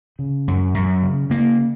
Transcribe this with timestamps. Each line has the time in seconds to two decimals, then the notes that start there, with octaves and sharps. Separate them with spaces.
0.19 C#3
0.48 F#2
0.74 F#2
1.02 C#3
1.30 C#3 A#3